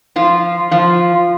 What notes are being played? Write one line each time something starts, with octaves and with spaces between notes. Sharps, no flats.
F3 F4
F3 F4